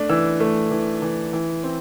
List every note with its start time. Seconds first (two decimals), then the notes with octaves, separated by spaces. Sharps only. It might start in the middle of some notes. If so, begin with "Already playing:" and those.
Already playing: A3 D4
0.10 E3 E6
0.40 A3
0.71 E3
1.02 E3
1.33 E3
1.64 C4